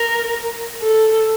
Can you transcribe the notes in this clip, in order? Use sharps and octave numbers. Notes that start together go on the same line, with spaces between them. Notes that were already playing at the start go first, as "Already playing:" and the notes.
Already playing: A#4
A4